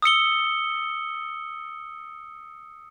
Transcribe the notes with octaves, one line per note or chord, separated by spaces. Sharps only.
D#6 E6 C#7 G7